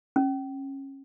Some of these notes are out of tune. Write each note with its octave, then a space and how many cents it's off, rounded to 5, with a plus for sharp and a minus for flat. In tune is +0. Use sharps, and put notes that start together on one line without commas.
C#4 -25